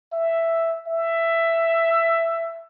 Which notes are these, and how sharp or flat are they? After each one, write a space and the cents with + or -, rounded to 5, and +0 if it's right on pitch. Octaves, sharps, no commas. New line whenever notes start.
E5 +5
E5 +10